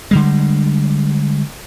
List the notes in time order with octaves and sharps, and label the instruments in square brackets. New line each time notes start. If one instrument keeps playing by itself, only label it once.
[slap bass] D3 G3 G#3